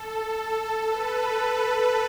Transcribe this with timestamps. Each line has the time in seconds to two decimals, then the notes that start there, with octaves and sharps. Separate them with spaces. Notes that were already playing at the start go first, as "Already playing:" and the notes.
Already playing: A4
0.13 A4
0.87 B4